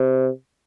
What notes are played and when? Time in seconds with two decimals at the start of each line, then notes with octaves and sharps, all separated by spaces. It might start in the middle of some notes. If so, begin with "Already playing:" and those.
Already playing: C3